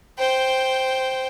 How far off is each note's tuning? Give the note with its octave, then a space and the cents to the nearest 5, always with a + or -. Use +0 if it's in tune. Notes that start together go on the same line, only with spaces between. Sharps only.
C5 +0 G5 -5